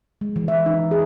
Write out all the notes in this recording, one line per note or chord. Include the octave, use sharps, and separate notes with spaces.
G#3
E3
E5
D#4
G#4